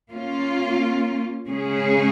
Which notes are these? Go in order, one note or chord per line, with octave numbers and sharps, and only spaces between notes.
A#3 C#4 F4
C#3 G#3 C#4 G#4